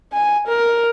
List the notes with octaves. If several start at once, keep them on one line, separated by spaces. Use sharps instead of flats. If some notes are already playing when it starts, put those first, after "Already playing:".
G#5
A#4